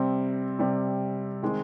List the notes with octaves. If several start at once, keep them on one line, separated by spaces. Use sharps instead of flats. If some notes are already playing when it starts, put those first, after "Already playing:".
Already playing: C3 G3 C4
C3 G3 C4
D#3 G#3 C4 D#4